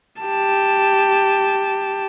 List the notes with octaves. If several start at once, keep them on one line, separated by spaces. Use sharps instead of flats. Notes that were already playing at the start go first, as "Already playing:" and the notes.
G4 A5